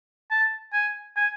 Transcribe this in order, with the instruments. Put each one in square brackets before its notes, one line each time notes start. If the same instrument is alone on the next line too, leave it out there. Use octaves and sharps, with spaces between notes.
[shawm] A5
G#5
G#5